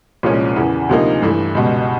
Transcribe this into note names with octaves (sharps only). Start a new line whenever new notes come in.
C2 A#2 F3 G#3 C#4
E2 C#3 E3
D2 C3 F3 A#3 D#4
G2 E3 A3
C#2 B2 G3